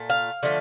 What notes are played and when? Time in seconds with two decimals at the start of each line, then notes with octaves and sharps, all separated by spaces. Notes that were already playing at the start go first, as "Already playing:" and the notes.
Already playing: A#2 A3
0.10 F5
0.43 D3 F3 A3